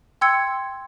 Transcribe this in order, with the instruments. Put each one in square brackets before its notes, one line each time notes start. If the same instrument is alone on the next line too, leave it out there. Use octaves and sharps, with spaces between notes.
[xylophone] G5 C6 E6 G#6 C#7